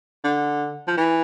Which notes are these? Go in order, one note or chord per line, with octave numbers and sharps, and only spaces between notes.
D3
F3
E3